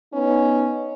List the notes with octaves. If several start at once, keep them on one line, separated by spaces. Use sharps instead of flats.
B3 C#4 D#4